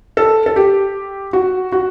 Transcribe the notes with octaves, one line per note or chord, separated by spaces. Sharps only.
A4
A4
G4
F#4
F#4